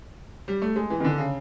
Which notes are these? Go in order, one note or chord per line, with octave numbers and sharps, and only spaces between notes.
G3
A3
G#3
E3
D#3
D3
C#3